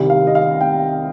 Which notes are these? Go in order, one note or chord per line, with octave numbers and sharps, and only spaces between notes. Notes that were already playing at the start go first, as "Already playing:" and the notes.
Already playing: C2 C3 D#3 G3
F5
D#5
F5
G5